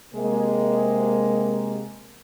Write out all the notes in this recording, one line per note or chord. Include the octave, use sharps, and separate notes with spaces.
C3 G#3 A#3